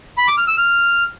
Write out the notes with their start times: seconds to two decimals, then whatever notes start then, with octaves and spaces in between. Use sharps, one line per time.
0.18 B5
0.28 D6
0.38 F6
0.48 E6
0.58 F6